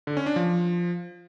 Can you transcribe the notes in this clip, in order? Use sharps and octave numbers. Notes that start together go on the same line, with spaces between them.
D3
C#4
D4
F3